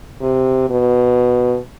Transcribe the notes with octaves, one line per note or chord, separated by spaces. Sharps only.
C3
B2